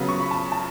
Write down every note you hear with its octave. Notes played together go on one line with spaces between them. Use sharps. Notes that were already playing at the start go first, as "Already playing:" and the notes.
Already playing: C#3 F#3 B3
C#6
B5
A5
A5